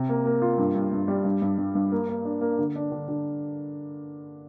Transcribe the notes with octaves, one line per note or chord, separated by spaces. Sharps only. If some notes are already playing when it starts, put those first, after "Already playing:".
Already playing: C3
A#3
A#3
F4
G2
G2
G2
G3
G2
G2
G2
G2
A#3
A#3
D4
A#3
D3
D4
D3
D3